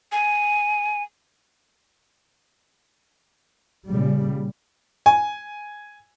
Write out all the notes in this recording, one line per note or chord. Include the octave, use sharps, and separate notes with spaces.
G#5
A#2 C#3 G3
G#5